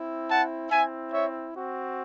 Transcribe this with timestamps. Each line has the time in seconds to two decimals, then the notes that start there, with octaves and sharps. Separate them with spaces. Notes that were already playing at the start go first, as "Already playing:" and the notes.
Already playing: C4 E4
0.29 F#5 A5
0.71 C4 E4 E5 G#5
1.12 C#5 E5
1.54 C4 F#4